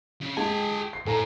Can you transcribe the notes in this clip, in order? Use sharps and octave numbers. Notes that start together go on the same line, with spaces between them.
C#3
G#3 G4 G#5 A5
C7
A2 A4 G#5 A#5